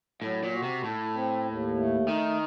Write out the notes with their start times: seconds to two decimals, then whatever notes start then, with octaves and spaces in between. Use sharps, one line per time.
0.22 A2 F#3
0.43 A#2
0.53 F#4
0.63 C3
0.83 A2 A4
1.15 C4
1.46 D#2
1.77 A3
2.08 D#3 D#4